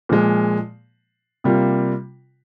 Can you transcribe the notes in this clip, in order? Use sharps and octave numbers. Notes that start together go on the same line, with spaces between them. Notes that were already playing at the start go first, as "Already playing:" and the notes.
A#2 F3 G#3
C3 G3 A#3 F4